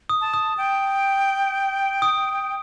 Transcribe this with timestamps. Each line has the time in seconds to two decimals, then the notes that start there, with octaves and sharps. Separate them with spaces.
0.09 D#6
0.21 A5
0.34 D#6
0.58 G5
2.02 D#6